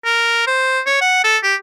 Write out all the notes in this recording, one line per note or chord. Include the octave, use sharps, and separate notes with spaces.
A#4
C5
C#5
F#5
A4
G4